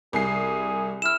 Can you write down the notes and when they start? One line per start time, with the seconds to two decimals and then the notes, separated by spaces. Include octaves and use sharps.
0.13 C2 G#4 G#5 C7
1.02 E4 F6 E7